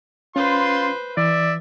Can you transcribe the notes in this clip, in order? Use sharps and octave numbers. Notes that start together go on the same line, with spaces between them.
C#4 F4 B4 C5 C6
E3 D5 E5